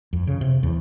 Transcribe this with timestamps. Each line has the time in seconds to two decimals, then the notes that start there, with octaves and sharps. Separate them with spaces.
0.13 F2
0.27 C#3
0.41 C3
0.63 E2